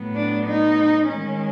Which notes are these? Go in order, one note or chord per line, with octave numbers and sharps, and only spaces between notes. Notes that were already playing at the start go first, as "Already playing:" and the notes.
Already playing: A2 F#3 B3
D4
D#4
D#3 G#3 C#4